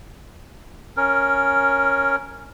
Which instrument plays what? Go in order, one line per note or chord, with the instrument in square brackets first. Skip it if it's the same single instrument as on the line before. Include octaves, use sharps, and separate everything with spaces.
[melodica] C#4 A#4